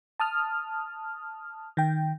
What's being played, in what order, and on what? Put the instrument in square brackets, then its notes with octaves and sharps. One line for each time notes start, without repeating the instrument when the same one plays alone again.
[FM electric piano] A5 D#6 F6
D#3 G5